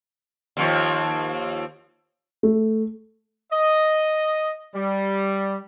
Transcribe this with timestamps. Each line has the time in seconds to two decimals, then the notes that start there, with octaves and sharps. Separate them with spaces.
0.57 D#2 F3 C#5
2.43 A3
3.52 D#5
4.75 G3